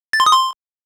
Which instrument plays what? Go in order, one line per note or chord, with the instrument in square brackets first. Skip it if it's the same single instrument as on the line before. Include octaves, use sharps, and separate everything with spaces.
[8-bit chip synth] A6
C6
D#6
C6